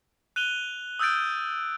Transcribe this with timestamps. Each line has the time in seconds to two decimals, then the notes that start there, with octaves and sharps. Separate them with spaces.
0.36 F#6 D#7 F7 G7
0.99 D#6 E6 F#6 G6 A6 D7